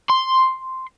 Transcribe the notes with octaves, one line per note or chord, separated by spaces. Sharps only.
C6